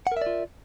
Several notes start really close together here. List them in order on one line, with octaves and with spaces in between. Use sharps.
F#5 A#4 E5 D5 F4